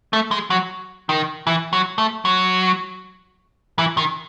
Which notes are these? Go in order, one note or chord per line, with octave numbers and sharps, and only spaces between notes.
A3
G#3
F#3
D#3
E3
F#3
A3
F#3
E3
D#3